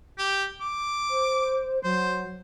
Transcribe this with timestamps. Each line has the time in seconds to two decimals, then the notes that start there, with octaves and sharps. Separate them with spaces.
0.19 G4
0.61 D6
1.10 C5
1.84 F#3 C5